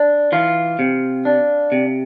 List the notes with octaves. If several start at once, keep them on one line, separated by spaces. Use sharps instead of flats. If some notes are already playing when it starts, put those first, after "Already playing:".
Already playing: D4
E3 F4
C3
D4
C3